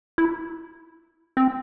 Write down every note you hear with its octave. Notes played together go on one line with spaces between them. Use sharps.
E4
C4